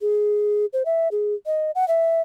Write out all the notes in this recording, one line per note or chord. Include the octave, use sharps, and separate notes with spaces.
G#4
C5
E5
G#4
D#5
F#5
E5